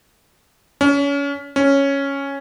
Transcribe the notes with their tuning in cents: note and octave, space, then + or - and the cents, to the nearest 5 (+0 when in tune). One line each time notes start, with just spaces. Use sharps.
C#4 +30
C#4 +0